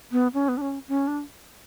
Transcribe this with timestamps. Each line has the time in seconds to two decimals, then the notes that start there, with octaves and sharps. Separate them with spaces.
0.12 B3
0.34 C#4
0.48 B3
0.57 D4
0.61 C#4
0.88 C#4
1.08 D4